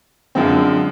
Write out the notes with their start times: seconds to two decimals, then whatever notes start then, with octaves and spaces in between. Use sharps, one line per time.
0.35 F#2 D3 F3 G#3 C4